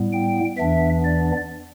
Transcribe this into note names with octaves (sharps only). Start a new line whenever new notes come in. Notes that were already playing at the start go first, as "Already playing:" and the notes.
Already playing: A2 G3 B3
G5
E2 E3 B3 D4 E5
D5